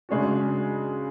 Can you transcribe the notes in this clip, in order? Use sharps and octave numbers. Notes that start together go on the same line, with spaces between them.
C#3 G#3 D4 F#4